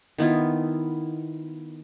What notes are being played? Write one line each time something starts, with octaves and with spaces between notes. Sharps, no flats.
D#3 B3 E4 F4